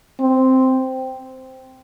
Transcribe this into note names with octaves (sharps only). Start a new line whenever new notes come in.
C4